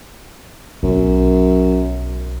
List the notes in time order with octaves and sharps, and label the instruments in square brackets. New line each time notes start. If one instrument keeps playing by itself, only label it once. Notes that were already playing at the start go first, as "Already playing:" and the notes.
[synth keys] B1 [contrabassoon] F#2